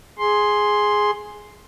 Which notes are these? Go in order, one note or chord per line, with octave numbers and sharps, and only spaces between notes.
G#4 C6